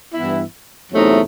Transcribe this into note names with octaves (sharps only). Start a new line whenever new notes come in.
G2 E3 B3 E4
E2 C3 F#3 A3 D#4